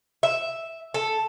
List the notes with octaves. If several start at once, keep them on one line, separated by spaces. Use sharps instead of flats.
E5
A4